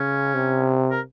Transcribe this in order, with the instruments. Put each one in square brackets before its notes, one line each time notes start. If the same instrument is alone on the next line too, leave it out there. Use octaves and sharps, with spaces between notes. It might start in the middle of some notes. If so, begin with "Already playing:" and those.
Already playing: [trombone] C#3 [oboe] C#4
[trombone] C3
[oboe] A#4